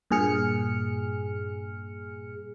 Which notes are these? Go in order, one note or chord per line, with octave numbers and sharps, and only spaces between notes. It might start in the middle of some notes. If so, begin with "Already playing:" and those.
G2 A#2 G#4 F6 C#7